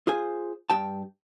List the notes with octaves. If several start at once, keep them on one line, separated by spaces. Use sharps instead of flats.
F4 G#4 C5 G#5
G2 G4 G5 A5